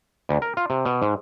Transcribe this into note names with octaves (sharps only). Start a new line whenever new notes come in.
D2
A#4
F4
C3
B2
G#2